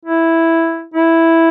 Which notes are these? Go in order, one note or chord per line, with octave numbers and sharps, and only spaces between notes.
E4
E4